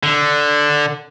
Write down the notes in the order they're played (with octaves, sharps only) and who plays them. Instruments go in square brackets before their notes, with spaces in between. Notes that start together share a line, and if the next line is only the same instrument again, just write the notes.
[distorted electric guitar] D3